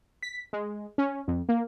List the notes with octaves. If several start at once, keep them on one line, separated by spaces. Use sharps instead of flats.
B6
G#3
C#4
F2
A#3